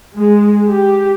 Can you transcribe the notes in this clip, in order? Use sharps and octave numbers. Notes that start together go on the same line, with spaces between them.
G#3
G4